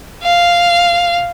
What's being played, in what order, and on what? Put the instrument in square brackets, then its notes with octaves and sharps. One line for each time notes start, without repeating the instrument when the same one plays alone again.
[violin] F5